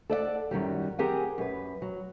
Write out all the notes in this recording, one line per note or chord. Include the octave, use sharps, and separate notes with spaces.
A4 D5 D#5 F#5
F#2 D#3 F#3 G3
C4 G4 G#4 A#4 F#5 G#5
F#2 B4
F#3